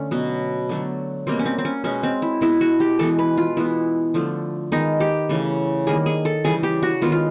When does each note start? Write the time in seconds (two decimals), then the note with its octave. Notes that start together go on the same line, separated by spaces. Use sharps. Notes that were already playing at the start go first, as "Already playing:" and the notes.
Already playing: D3 A3 C#4
0.11 B2 F#3 B3
0.69 D3 F#3 A3
1.27 B2 G3 A#3 C4
1.39 C#4
1.46 C4
1.58 C4
1.65 C#4
1.84 B2 G#3 B3 C#4
2.03 C4
2.22 E4
2.41 B2 G#3 B3 E4
2.61 F#4
2.80 G4
2.99 E3 G#3 B3 A4
3.19 B4
3.38 F4
3.57 E3 G#3 B3 E4
4.14 D3 F3 A3
4.72 D#3 G#3 B3 D#4
5.00 G4
5.29 C#3 E3 A3
5.87 D#3 G3 A#3 G#4
6.06 G#4
6.25 A4
6.44 C#3 E3 G3 G#4
6.63 G4
6.83 F#4
7.02 D#3 G#3 B3 F4
7.12 F4